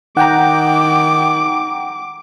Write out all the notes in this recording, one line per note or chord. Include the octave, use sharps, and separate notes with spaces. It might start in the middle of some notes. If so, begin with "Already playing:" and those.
D#3 F#5 G5 A#5 D6